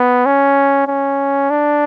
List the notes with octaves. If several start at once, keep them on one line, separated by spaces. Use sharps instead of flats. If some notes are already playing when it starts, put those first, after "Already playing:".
Already playing: B3
C#4
C#4
D4